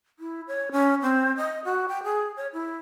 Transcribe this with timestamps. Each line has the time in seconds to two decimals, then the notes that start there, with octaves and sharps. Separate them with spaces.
0.19 E4
0.48 C#5
0.72 C#4
1.02 C4
1.37 D#5
1.65 F#4
1.88 G5
2.04 G#4
2.37 C#5
2.53 E4